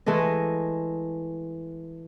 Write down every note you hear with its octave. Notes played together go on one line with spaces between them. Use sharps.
E3 G#3 A3 D#5